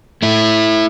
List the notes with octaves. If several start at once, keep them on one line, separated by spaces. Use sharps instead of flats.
A3 E4